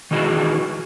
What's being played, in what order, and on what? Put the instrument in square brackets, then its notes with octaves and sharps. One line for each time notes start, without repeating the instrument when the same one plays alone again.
[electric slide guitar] D#3 E3 D#4 F#4 G#4